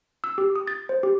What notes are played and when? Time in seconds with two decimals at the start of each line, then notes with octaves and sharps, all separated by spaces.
0.24 E6
0.38 G4
0.56 D#6
0.68 A6
0.89 C5
1.03 G4